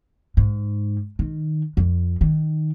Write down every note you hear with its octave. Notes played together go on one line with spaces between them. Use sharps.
G#2
D#3
F2
D#3